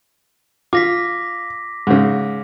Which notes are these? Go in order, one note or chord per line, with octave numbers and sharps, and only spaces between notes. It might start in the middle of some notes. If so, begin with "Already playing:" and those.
F4 D6 A#6 B6
G#2 C#3